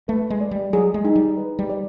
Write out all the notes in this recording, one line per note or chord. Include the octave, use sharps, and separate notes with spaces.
A3 B4
G#3
D5
G3
F#3 G#4
G#3
D#4
G3
B4
G3
D5